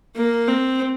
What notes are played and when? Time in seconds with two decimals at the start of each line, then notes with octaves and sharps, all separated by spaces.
0.16 A#3
0.48 C4